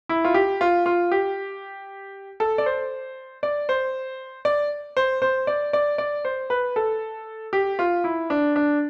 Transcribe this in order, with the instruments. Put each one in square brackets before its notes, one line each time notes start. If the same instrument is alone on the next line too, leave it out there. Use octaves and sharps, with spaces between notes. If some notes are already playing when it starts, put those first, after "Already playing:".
[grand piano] E4
F4
G4
F4
F4
G4
A4
D5
C5
D5
C5
D5
C5
C5
D5
D5
D5
C5
B4
A4
G4
F4
E4
D4
D4